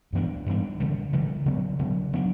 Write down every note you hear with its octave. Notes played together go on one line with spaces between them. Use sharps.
G2 E3 B3 D4
G2 E3 B3 D4
C#3 E3 G3
C#3 E3 G3
C#3 F#3 B3
C#3 F#3 B3
F#3 B3 D4